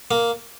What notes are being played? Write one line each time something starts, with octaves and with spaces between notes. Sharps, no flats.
A#3